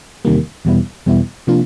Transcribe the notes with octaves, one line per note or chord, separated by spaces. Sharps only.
E2 C3 D#3 G3 A#3
E2 B2 G3 B3 E4
E2 B2 G3 B3 E4
C3 F3 A#3 D4 F4